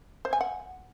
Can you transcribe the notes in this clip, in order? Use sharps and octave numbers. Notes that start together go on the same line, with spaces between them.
C5
G#5
F#5